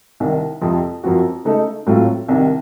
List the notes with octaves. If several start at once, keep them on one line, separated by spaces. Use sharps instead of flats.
C2 C3 D#3
F2 C3 F3
F#2 F3 C4 F#4
C#3 A3 D#4 A4
A2 F#3 A3 C4 F4
C2 C3 D#3